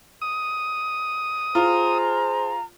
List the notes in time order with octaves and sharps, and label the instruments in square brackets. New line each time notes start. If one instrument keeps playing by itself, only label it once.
[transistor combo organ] D#6
[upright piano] F4 [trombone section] G#4 C5 [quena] A#5